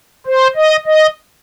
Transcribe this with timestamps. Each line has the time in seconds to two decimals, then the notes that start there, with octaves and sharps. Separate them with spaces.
0.26 C5
0.55 D#5
0.86 D#5